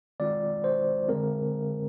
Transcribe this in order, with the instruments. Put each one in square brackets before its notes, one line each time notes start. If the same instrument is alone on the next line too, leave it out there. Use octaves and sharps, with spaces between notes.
[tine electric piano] D#3 G#3 C4 F4 D5
C5
D3 G#3 C4 A#4